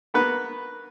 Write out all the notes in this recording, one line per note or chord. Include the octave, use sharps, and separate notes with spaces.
A#3 B3 F#4 B4